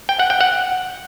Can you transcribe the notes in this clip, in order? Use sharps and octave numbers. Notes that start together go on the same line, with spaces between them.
G5
F#5
G5
F#5